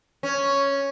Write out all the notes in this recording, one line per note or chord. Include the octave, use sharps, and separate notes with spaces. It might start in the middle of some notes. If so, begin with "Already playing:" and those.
C#4